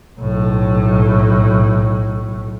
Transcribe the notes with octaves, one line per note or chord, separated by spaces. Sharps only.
B1 A2